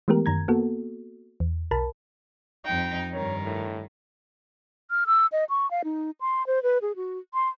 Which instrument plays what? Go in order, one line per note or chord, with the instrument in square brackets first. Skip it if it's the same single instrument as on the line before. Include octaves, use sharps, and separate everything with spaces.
[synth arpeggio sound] E3 G#3 A3 B3 G4 A#4
F#2 D#3 A#5 G#6
A#3 B3 F#4 A4
E2
B1 A#4 A5 B5
[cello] F2 D#4 [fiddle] G5
[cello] G2 D#3 [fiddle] A#4 [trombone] C#5
[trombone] A2
[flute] F6
E6
D#5
C#6
F5
D#4
C6
C5
B4
G#4
F#4
C6